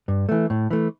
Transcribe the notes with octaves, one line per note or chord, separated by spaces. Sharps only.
G2
E3 A3
A2
E3 A3